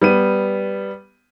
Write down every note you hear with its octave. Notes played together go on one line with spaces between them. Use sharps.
G3 B3 D#7